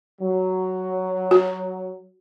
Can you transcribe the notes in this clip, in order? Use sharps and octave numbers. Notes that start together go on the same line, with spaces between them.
F#3
F#4